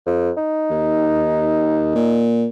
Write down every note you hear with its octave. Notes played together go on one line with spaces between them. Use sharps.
F2
D#4
D#2
A#2